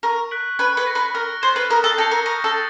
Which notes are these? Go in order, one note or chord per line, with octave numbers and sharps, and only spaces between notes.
A#4 C#6
F#6 B6 D7 F#7
B4 F#6
B4
A#6 C#7
B4
A#4 F6
C5 A6 C7 E7
B4
A#4 D#6
A4
A4 G6 A#6 C#7 F7
A#4
A#4 C#6
A4
E6 A6